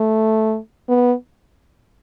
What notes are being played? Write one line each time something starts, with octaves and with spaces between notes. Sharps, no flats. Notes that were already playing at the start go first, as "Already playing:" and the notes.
Already playing: A3
B3